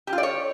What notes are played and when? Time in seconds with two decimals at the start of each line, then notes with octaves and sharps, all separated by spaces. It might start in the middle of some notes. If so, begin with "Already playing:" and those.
0.07 G4
0.13 F4
0.18 D5
0.23 C#5